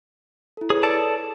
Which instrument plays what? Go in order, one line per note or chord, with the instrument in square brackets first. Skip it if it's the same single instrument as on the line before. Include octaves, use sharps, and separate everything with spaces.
[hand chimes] E4 A4
[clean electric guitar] G#4 [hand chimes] B4 C#5
[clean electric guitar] A4 D5 A5